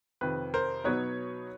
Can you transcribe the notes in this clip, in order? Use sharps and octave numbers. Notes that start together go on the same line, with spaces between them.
F2 C3 D#3 B4
A#4 C5
B2 F#3 B3 D#4 B4 C#5